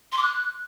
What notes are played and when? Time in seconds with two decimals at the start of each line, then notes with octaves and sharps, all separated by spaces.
0.12 C6
0.17 D6
0.23 F#6